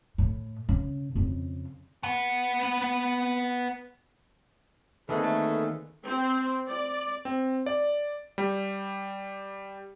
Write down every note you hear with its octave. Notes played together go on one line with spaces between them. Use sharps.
A2
C#3
F2 C#3
B3 F#5
D2 D#3 G#3 A#3 C4 G#4 A4 B4
A3
C4
D5
C4
D5
G3